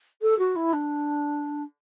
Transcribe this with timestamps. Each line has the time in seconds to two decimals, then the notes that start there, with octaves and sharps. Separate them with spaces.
0.22 A4
0.38 F#4
0.55 E4
0.73 D4